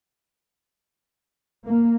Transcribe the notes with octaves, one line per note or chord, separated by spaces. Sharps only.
A#3